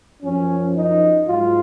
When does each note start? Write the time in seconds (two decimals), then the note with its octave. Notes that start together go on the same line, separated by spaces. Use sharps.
0.23 F#2 F3 C#4
0.76 D#4
1.28 G#2 F#3 F4